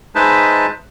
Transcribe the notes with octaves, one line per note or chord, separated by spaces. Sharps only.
G#3 D#4 B4 C5 E5 A5